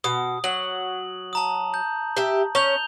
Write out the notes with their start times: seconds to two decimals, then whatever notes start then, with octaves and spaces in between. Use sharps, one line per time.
0.04 B2 D#6
0.44 F#3 F#7
1.33 A5 A#5 D#6
1.74 G6
2.17 G4 E5
2.55 C#4 G6 F7 G7